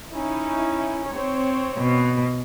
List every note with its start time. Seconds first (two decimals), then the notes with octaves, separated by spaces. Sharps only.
0.11 C#4 D#4 E4
1.09 C4 C#5
1.76 B2